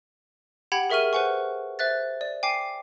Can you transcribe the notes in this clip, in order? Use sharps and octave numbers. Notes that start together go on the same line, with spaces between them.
G4 F#5 G5 B5 G#6 F#7
G#4 A#4 E5 C#6 F6 D#7
B4 C5 F#5 G#5 C#6
C5 E5 F#6 A6
D5
G5 G#5 D6 C7